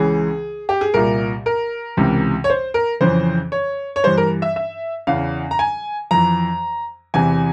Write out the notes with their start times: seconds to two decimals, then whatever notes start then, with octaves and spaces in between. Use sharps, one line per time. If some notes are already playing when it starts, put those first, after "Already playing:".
Already playing: C#2 C#3 E3 G#4
0.69 G4
0.81 G#4
0.94 C2 A#2 A#4
1.46 A#4
1.97 C#2 C3 E3
2.44 C#5
2.50 C5
2.74 A#4
3.01 F2 C#3 E3 C5
3.52 C#5
3.96 C#5
4.04 G2 E3 C5
4.17 A#4
4.42 E5
4.56 E5
5.07 E2 C#3 E3 F5
5.51 A#5
5.59 G#5
6.11 F2 E3 A#5
7.14 E2 C3 E3 G#5